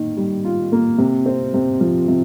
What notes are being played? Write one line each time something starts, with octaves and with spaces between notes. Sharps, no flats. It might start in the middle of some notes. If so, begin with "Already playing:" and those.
Already playing: D#3 A#3
G3
F4
A#3
C3
C4
C3
F3
C3